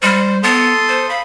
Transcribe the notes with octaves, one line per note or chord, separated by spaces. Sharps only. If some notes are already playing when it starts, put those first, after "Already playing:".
G3 C5
B3 A4 C6 D#6
C5
F5 B5